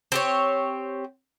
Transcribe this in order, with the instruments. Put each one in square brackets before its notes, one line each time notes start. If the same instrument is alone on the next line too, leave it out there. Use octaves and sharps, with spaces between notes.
[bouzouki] C4 G4 C#5